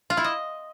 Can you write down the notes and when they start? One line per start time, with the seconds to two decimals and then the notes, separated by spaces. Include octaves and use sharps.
0.10 F4
0.17 E4
0.24 D#5